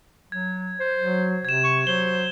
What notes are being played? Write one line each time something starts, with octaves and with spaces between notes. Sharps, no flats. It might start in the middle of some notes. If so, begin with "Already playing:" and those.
F#3 G#6
C5
F#3
C3 G#6 E7
C#6
F#3 C5 G7